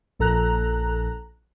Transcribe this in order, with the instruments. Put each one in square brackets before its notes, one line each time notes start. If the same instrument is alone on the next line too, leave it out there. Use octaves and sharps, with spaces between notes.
[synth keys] A#1 A4 A#5 F#6